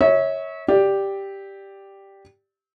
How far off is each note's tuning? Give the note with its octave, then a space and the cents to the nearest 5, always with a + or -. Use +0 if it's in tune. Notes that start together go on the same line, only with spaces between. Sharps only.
C#5 -5 E5 -35
G4 +0 D5 +0